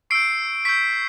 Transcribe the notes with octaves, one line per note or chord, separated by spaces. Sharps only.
C#6 E6 G6 C7 D7
C#6 E6 G6 B6